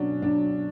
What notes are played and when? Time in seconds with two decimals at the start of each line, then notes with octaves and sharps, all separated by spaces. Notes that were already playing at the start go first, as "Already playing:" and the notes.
Already playing: B2 F#3 C#4 D4
0.22 F#3 D4